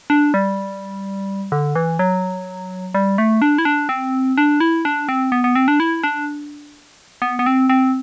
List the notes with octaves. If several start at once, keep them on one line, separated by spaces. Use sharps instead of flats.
D4
G3
D3
E3
F#3
G3
A3
D4
E4
D4
C4
D4
E4
D4
C4
B3
B3
C4
D4
E4
D4
B3
B3
C4
C4